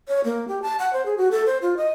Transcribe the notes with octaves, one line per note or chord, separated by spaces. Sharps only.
C#5
A#3
G4
A5
F#5
C5
G#4
F#4
A4
C5
F4
D#5